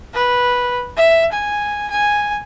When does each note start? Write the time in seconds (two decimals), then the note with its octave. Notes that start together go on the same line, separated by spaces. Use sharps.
0.14 B4
0.97 E5
1.32 G#5
1.91 G#5